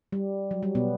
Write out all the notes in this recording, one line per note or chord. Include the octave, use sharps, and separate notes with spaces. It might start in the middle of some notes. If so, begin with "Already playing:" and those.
G3
F#3
G3
B2 B3